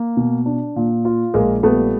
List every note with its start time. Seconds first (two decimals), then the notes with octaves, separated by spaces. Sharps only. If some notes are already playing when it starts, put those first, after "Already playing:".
Already playing: A#3
0.17 B2
0.46 D4
0.76 A#2
1.05 F4
1.34 A#1 G#3 A#3
1.63 G3 A3 B3